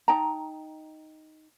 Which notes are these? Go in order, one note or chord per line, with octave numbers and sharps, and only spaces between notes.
D#4 G5 A5 A#5